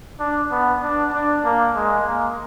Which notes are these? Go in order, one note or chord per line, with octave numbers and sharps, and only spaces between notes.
D4
B3
D4
D4
A#3
G#3
A#3